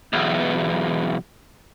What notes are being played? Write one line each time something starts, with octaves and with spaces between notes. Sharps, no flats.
B1 E2